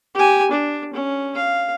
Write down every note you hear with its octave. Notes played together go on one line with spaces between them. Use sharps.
G4 G#5
D4
C#4
F5